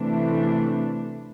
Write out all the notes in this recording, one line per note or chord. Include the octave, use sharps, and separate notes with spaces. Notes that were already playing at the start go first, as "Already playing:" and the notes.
Already playing: C3 E3 A3 D4